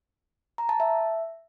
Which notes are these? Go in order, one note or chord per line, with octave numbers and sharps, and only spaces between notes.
A#5
A5
E5